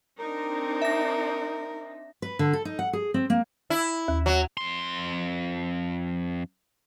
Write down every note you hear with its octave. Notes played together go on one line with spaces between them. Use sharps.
C4 D4 D#4 A#4
E5 A#6
B4
D3
A4
D#4
F#5
G#4
C4
A#3
E4
D#2
F#3
F2 C6